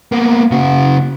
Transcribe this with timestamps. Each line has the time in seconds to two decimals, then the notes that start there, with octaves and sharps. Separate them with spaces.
0.12 A#3 B3
0.51 C#3 F#4